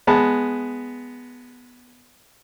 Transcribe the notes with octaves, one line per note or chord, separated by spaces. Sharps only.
G#3 B3 A5